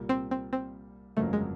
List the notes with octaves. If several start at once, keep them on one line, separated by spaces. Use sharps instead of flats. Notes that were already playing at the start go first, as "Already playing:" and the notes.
Already playing: C2 A#2 G3 A#3
C4
C4
C4
G1 F2 C#3 F#3 A3 A#3
G#3